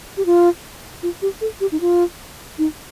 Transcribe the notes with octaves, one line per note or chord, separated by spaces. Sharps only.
G4
F4
F4
G4
A4
G4
D#4
F4
D#4